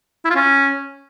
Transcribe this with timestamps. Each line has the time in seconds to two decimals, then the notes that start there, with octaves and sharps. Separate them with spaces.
0.25 E4
0.30 F4
0.36 C#4